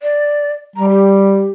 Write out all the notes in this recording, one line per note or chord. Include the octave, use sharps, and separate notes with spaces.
D5
G3 A#5
G4